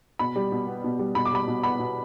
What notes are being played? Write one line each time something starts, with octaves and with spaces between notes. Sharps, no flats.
B2 B5
G3
B2
B3
B2
G3
B2 B5
D6
G3 B5
B2
B3 B5
B2